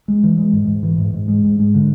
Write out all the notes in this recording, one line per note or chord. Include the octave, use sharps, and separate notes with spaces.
G#3
E3
G#3
G#2
G#2
E3
G#2
G#2
G#3
G#2
G#3
D3